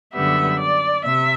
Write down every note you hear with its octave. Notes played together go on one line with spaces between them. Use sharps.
F#2 D3 G3 B3 E5
D5
C3 E5